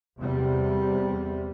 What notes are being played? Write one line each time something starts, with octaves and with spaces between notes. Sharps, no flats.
E2 C3 G3